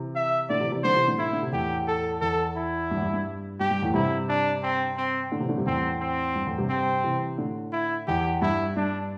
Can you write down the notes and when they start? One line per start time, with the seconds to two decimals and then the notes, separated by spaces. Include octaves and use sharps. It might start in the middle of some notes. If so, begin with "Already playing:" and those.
Already playing: C3 E3
0.15 E5
0.49 A2 D3 D5
0.60 C3 E3
0.72 C3 E3
0.84 D3 G3 C5
0.95 C3 E3
1.07 A2 D3
1.18 A2 D3 E4
1.33 D3
1.43 C3
1.52 E2 A2 G4
1.87 A4
2.21 E2 A4
2.56 E4
2.91 G2
2.97 E2
3.02 G2
3.13 G2
3.60 G2 G4
3.70 G2
3.82 E2 A2
3.94 G2 C3 E4
4.29 D4
4.63 C4
4.97 C4
5.32 A2 D3
5.40 C3 E3
5.49 A2 D3
5.58 G2 C3
5.66 E2 A2 C4
6.01 C4
6.35 G2
6.46 E2 A2
6.58 G2 C3
6.69 C4
7.04 C3 E3
7.38 A2 D3
7.73 E4
8.07 E2 G4
8.41 G2 E4
8.76 G2 D4